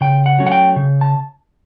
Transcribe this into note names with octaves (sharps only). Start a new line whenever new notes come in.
C#3 G5
F#5
F#3 A3 C#4
F#5
G5
C#3
A5